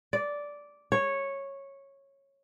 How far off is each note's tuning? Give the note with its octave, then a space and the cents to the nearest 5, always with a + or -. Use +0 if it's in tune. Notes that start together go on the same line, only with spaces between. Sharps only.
D5 -10
C#5 -10